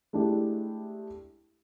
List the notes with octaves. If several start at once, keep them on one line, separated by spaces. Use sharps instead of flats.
G#3 A3 D4 E4 G4 G#4